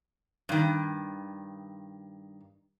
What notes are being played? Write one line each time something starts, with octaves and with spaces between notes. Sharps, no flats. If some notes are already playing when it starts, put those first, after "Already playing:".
G2 D#3